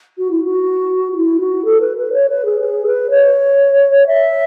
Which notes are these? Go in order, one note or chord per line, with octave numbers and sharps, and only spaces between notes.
F#4
E4
F#4
F#4
E4
F#4
A4
B4
B4
C#5
B4
G#4
G#4
B4
C#5
E5